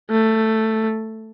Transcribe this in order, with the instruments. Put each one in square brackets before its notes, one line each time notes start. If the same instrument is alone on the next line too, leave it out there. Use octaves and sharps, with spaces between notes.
[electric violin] A3